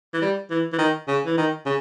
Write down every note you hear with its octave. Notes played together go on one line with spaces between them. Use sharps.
E3
G3
E3
E3
D#3
C#3
E3
D#3
C#3